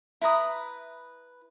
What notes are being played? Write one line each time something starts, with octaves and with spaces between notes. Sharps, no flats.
E4 B4 A#5 D#6